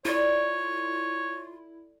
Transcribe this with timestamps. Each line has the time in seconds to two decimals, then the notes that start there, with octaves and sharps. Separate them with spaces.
0.05 E4 F4 A4 C#5 D5